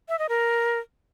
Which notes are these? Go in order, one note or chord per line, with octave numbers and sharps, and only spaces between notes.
E5
D#5
A#4